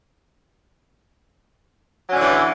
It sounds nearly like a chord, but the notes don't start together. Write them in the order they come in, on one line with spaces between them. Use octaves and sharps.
F#3 C#4 D3 A2 E3